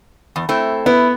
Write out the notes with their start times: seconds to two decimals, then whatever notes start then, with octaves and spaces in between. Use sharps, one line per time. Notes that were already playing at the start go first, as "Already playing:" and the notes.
0.36 E2
0.49 A3 C4 E4
0.86 B3 E4